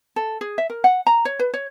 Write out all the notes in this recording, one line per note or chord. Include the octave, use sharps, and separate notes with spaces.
A4
G#4
E5
A#4
F#5
A#5
C#5
B4
C#5